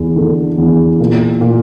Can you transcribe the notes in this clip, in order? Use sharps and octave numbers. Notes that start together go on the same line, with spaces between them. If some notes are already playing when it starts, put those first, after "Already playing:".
Already playing: E2
D3
E2
A#2
A#2